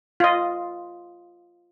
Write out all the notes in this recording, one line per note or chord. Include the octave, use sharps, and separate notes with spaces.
F4 D#5